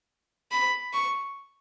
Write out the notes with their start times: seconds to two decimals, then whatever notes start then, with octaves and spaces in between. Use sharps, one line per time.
0.52 B5
0.93 C#6